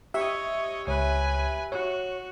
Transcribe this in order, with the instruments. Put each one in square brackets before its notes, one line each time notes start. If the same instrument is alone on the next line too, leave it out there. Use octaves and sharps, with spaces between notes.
[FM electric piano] G4 E5 [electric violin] C#5 D#5
[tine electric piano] C#2 C#5 [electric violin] B4 G#5
[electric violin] F#4 [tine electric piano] C#5